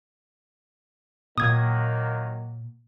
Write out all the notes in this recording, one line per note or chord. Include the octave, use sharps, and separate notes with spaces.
A#2 D#3 F#3 A#3 D#6 G#6